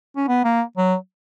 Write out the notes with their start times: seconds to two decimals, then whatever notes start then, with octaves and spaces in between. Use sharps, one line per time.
0.17 C#4
0.28 B3
0.44 A#3
0.77 F#3